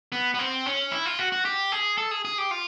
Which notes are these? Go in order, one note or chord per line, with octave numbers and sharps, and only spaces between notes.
B3
B3
C4
C#4
E4
F4
F#4
F#4
G4
G#4
A4
G#4
G#4
G4
F4